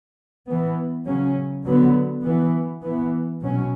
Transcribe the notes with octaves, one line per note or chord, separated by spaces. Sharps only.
E3 B3
C#3 F#3 C#4
D3 F#3 B3
E3 B3
E3 B3
B2 F#3 C#4